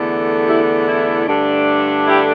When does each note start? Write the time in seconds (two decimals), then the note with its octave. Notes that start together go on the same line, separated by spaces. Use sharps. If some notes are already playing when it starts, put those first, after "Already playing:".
Already playing: E2 D3 A3
0.47 E4 G4
0.88 E4
1.27 G2 D3 A3 D4
2.07 E4 G4